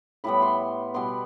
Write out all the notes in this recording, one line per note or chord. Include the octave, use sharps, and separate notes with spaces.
A2 G3 B3 B5
C6
B2 G3 B3 C6